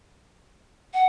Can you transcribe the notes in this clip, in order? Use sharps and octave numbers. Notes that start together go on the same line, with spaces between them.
F#5